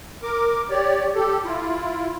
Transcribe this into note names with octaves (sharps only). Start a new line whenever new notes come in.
A#4 D6
G4 C#5 D5
G4 A4
E4 F4